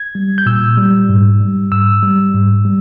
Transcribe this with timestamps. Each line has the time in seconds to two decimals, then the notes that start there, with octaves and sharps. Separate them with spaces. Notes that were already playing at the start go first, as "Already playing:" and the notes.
Already playing: G#6
0.15 G3
0.38 G6
0.46 A#2 E6
0.78 G3
1.09 G#2
1.40 G3
1.72 G#2 E6
2.03 G3
2.34 G#2
2.65 G3